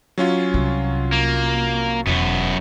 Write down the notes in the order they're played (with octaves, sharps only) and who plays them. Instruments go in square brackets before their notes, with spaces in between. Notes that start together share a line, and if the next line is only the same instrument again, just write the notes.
[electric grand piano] F#3 C#4 F4
[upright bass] C2 C3
[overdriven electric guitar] A#3
[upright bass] E1 [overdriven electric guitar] F#2 B3